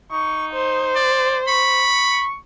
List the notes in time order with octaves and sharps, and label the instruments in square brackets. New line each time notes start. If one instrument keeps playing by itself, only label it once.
[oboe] D#4 [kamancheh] C#6
[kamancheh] C5
[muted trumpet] D5
[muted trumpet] B5 [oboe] C#6